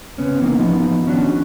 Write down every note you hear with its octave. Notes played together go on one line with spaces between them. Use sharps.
C#3 B3 C#4
E3 A#3 D#4
F3 B3 D#4
D#3 C#4 D4 F#4